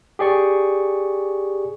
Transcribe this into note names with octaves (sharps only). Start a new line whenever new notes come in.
G4 G#4 D5 C#6